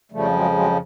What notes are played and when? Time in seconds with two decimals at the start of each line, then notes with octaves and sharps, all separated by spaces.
0.12 F2 C#3 F3 G3 A3
0.32 F#3 G#3
0.53 F#3 G#3